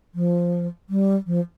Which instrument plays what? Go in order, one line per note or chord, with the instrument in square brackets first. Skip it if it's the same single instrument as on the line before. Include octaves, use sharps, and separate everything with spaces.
[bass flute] F3
G3
F3